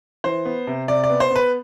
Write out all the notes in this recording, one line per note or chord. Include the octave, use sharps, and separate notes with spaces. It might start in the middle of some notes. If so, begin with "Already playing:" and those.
E3 C5
B3
C3
C3 D5
D5
B3
C5
B3 B4